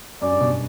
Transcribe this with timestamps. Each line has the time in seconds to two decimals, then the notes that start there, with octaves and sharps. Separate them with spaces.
0.22 F#2 D5
0.31 G2
0.41 B2
0.52 B2